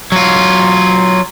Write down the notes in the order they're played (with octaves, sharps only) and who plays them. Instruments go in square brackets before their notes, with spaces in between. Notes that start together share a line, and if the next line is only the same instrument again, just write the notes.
[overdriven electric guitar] F#3 F4